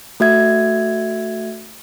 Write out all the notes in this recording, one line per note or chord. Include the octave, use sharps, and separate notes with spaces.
A3 F#4 E5 G#6